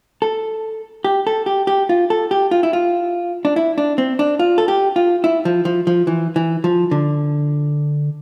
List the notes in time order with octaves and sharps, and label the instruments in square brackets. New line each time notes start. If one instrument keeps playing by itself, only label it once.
[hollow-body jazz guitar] A4
G4
A4
G4
G4
F4
A4
G4
F4
E4
F4
D4
E4
D4
C4
D4
F4
A4
G4
F4
E4
F3
F3
F3
E3
E3
F3
D3